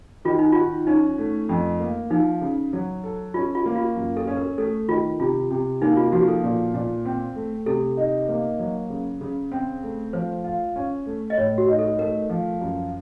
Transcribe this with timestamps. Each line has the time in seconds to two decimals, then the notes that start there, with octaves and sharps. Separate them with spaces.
0.25 D#3 F4
0.39 D#4
0.52 F4 F#4
0.87 C#4 D#4
1.18 A3
1.49 F2
1.80 A#3
2.10 F3 D#4
2.41 C#3
2.73 F#3
3.04 A4
3.34 C#4 F4
3.55 F4
3.66 A#3
3.75 F4
3.96 F#2
4.17 A4
4.27 C#4
4.37 A#4
4.58 A3 A4
4.88 D#3 F4
5.20 C3 F4
5.51 C3
5.82 A#3 D#4
5.97 F4
6.12 F3 F#4
6.28 A4
6.44 A#2
6.74 A#2
7.05 C4
7.36 A3
7.66 C3 A4
7.97 D#4
8.29 A#3
8.60 F#3
8.90 C#3
9.21 C#3
9.52 C4
9.83 A3
10.13 F3 C5
10.44 F4
10.76 C#4
11.06 A3
11.30 D#5
11.37 A2 C#5
11.58 F#4
11.68 D#4
11.79 A4
11.99 A3 A#4
12.30 F3
12.61 F#2